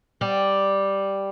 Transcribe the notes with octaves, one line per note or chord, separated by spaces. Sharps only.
G3